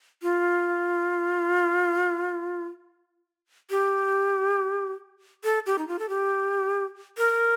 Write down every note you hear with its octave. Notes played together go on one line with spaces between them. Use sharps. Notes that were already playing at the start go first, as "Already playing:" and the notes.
F4
G4
A4
G4
D#4
F4
A4
G4
A#4